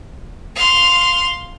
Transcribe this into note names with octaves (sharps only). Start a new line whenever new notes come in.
F5 C6